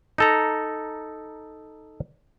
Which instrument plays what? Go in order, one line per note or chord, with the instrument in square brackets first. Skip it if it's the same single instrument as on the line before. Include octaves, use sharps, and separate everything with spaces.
[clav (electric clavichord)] D#4 A4 A#5